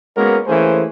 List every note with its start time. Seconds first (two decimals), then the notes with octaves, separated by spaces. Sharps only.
0.16 G#3 A#3 B3 C#4 F#4 A#4
0.46 E3 A3 A#3 C#4 G#4 C5